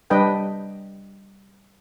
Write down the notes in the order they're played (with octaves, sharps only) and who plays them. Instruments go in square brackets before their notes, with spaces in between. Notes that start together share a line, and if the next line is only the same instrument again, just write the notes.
[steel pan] G3 D4 B4 D#5 G5